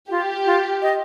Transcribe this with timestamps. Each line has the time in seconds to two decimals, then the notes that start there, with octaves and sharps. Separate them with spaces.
0.10 F4 G4
0.46 F4
0.82 D#5